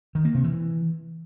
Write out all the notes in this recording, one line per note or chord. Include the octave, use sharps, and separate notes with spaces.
D#3
A#3
C3
E3